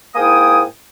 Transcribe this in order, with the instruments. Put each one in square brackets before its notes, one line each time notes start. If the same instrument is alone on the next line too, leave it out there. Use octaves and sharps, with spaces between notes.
[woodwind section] G#2 A#3 E4 G5 G#5 D#6